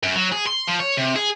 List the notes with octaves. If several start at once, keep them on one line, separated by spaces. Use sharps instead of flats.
F#2
F#3
G#4
C6
F3
C#5
C3
G#4